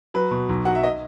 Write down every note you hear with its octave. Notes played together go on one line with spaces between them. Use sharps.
F#3 B4
B2
B1
F#3 F#5
E5
D#5